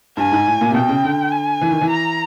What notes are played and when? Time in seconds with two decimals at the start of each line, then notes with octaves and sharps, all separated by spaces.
0.17 G2 G#5
0.32 G#2
0.47 A2
0.61 A#2
0.70 C3
0.74 B2 G5
0.89 C#3
1.04 D3
1.32 G#5
1.61 E3
1.71 D#3
1.81 E3
1.89 A#5